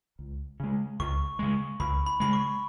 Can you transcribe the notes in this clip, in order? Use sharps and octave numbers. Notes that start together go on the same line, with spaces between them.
C#2
C#3 G#3
C#2 C#6
C#3 G#3
C#2 B5
B5
C#3 G#3 B5
C#6